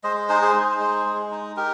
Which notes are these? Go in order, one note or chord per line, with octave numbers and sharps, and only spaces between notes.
G#3 C5 D#5
D#4 G#4 C5
G#4 C5
D#4
G#3
G#3
D#4
D#4 G4 A#4